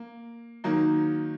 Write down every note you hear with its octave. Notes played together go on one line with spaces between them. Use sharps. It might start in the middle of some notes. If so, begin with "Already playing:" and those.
Already playing: A#3
D#3 F#3 A#3 D#4